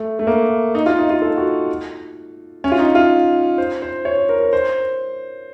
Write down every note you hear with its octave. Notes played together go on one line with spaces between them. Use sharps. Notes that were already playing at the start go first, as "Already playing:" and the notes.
Already playing: A3
A3
A#3
D#4
F4
D#4
F4
A4
F#4
C#4
F4
D#4
F4
C5
C5
C#5
C5
A#4
A#4
C5